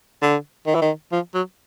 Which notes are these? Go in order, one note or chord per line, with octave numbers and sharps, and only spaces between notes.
D3
D#3
E3
D#3
F3
F#3